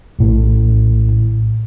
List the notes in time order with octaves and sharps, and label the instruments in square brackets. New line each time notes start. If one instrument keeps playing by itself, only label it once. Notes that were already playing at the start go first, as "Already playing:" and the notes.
[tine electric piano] A#1 A2